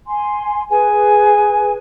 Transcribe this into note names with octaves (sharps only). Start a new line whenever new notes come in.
G#5 C6
G#4 B4 G#5